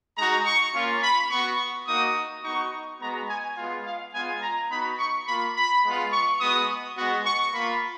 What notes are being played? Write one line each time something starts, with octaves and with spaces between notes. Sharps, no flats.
G#3 D#4 F#4 A#5
C#6
A#3 C#4 F4
B5
B3 F#4 C#6
A#3 D#4 F#4 D#6
B3 D#4 F#4 C#6
G#3 B3 F#4 A#5
G#5
G#3 B3 F4
F5
G#3 B3 F4 G#5
A#5
B3 D#4 F#4 B5
C#6
A#3 F4 B5
B5
G#3 B3 F4
C#6
G#3 B3 F#4 D#6
G#3 B3 F#4
C#6
A#3 F4 B5